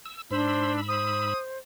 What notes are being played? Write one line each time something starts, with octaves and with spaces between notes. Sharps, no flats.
E6
G#2 D4 C5 B5 E6
C5 D#6